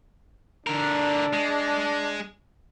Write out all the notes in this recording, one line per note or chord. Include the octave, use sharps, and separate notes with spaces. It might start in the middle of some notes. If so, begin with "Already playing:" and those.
D3 D4 A#4
G#3